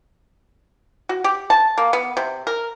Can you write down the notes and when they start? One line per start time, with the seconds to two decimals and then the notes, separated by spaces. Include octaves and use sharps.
1.09 F#4
1.24 G4
1.50 A5
1.78 A#3
1.93 B3
2.17 C3
2.47 A#4